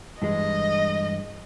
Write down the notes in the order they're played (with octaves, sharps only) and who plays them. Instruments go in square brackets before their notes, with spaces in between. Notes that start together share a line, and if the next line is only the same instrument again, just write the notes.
[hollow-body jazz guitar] G2 E3 G#3 [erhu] D#5